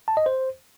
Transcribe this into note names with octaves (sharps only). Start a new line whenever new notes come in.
A5
D#5
C5